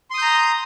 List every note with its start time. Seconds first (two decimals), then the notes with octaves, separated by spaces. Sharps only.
0.10 C6
0.14 D#6
0.18 G6
0.22 A#5